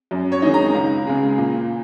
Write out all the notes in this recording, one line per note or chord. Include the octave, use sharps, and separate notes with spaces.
F#2
C#5
D#3 G#3 D#4
A#5
C#2
C#3 G#3
A#2